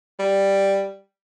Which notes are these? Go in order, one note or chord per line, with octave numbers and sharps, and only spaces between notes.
G3